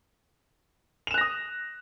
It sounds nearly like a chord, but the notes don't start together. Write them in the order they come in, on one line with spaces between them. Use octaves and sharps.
F7 E7 F#6 A#6 D#6